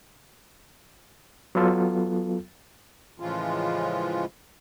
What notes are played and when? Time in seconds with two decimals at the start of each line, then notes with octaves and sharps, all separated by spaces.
1.55 F#3 B3 F4 A4
3.20 A2 C#3 E3 F3 G#3 F4